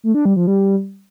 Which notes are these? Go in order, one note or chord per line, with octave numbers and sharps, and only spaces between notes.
A3
D4
G3
F3
G3